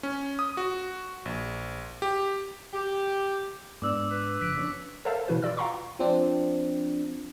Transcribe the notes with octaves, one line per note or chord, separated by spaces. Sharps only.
C#4
D#6
F#4
A#1
G4
G4
G#2 B3 D4 D6 E6
B4
F#1 F3 B6 D7
C#4 D4 C#5
A4 A#4 C5 E5 F5 A5
B2 E3 E4 F#4 B4
F4 D5 E6
F5 G5 A#5 C6 C#6
F3 C4 D4